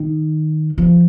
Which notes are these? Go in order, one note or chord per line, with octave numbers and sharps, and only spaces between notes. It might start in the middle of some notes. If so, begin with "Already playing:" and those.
Already playing: D#3
F3